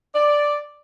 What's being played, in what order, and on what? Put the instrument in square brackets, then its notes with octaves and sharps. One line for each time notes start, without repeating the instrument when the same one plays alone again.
[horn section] D5